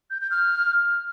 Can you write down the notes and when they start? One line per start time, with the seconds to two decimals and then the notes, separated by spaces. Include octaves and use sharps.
0.10 G6
0.21 G6
0.31 F6